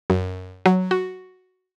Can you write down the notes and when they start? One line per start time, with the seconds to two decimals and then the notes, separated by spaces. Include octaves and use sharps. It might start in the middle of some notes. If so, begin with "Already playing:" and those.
0.10 F#2
0.66 F#3
0.91 F#4